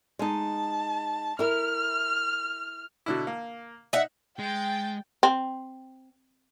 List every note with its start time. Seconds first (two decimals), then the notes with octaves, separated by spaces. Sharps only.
0.19 G#3 D#4 A5
1.39 E4 A#4 F6
3.06 B2 D3 E4
3.27 A#3
3.93 D#4 E5 F#5
4.39 G#3 G5 A6
5.23 C4